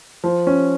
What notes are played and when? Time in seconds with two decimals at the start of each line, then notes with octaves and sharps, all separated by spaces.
0.24 F3
0.47 C#4